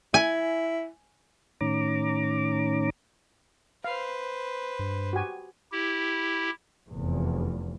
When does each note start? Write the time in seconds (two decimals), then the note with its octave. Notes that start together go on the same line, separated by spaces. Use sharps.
0.14 E4 G#5
1.61 A2 D#3 C#4 A#5 D6
3.84 B4 C5 F5
4.79 G2
5.13 F#4 G4 G#5
5.72 E4 G4
6.88 F1 E2